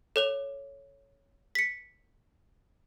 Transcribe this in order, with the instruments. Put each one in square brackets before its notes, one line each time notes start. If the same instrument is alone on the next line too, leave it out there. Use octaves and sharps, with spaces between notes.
[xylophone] A4 C#5 F7
B6 C#7